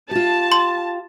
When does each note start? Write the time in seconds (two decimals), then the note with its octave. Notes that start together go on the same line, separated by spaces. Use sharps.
0.11 F4 G4 A5
0.52 C6